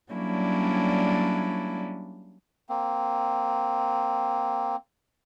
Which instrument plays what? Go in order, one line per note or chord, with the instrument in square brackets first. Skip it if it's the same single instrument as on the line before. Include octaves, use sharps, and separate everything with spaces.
[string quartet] F#3 G3 A#3 C#4 D4 E4
[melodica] A#3 C4